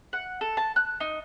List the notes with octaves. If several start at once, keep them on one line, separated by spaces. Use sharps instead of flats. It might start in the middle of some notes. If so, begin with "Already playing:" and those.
F#5
A4
A5
F#6
D#4